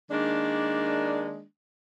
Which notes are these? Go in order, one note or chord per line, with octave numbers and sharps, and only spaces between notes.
D#3 G#3 A#3 D4